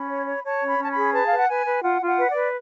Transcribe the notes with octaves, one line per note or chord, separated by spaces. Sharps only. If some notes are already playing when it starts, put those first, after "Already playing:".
Already playing: C#4 B5
C#5
C#5
C#5 A5
C#4
B5
C#4
A5
B5
G#4
B4 A5
B4 F5
F#5
B4 G#5
B4
F4 F#5
F4 F#5
B4
D5
B4